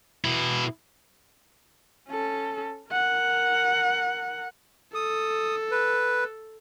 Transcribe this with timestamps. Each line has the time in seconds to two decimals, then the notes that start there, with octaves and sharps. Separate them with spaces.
0.24 B2 E4
2.08 C#4 A4
2.91 A#4 F#5
4.95 A4 D#6
5.71 B4